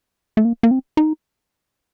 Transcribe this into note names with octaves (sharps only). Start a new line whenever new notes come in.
A3
A#3
A#3
C4
D#4